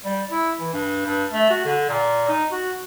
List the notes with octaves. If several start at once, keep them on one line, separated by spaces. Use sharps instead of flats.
G3
E4
E3
G2
G2
A3
F#4
D3
A#2
D#4
F#4